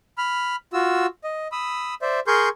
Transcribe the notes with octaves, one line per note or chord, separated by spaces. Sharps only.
B5 F6
F4 F#4 E6
D#5
B5 D#6 E6
C5 D5 E5
G#4 A#4 C6 C#6 G6